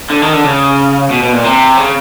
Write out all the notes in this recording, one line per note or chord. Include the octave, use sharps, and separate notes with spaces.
D3
D#3
D3
C#3
B2
B2
A#2
C3
C#3